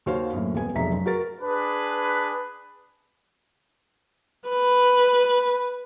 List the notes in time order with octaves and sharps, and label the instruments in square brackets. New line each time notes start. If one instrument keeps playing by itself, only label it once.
[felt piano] D#2 F#4 C5 C#5 F5
F#2 A2 A#3
D#1 G3 B3 G#5
F1 B1 G#3 E5 A#5 B6
F#2
F#4 A#4 A6
[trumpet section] D4 G#4 B4
[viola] B4